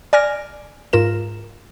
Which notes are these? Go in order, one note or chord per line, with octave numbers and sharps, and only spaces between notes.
D5 G#5 F6 A#6
G#2 F4 A#4 E7